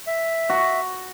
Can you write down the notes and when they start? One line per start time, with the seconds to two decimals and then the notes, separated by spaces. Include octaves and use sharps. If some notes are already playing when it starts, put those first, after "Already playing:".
0.07 E5
0.49 F#4